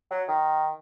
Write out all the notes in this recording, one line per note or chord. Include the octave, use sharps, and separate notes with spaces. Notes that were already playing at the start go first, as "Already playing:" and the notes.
F#3
D#3